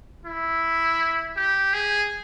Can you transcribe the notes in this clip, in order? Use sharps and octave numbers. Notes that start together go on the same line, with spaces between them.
E4
G4
G#4